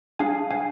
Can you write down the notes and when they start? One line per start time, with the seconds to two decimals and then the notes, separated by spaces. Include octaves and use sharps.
0.19 D4 G#4 F5 G#5
0.51 F5 G#5